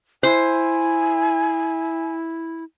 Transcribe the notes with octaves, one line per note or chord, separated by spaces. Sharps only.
E4 C5 G#5